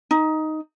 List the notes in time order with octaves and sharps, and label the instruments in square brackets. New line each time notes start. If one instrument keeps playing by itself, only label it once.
[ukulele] D#4